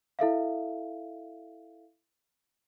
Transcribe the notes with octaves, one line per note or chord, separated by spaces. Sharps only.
E4 A4 E5 F5